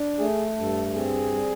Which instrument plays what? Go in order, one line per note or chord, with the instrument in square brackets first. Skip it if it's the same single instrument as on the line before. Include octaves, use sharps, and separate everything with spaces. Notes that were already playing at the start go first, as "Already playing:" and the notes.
Already playing: [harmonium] D4
[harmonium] A3 [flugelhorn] G#4
[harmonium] G2 [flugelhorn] A4
[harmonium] C4 [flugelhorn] G#4
[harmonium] G3